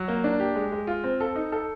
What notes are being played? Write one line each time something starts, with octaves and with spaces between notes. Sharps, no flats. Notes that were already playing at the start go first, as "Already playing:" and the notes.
Already playing: F#3
A#3
D4
G4
G#3
G#3
F4
C4
A4
D#4
A4